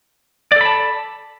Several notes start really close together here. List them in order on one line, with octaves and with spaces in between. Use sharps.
D5 A4 B5 A5